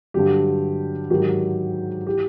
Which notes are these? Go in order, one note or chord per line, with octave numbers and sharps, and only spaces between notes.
G2 D3 F#3 G4
G#2 D#3 F#3 G4
E3 G4